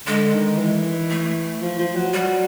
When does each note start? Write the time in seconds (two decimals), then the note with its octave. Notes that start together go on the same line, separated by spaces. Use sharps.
0.07 D3 G#3
0.33 D#3
0.59 E3
1.10 A3
1.62 F3
1.79 F3
1.96 F#3
2.13 F#3 G3